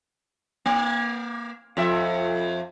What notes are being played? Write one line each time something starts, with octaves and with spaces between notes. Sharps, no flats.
A#3
F2 F4 E5